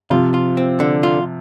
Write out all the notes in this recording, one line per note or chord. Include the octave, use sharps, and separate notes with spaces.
C3 F3 F4
F4
C4
D3
F4